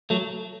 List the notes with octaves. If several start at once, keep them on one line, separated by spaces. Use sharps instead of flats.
F#3 A3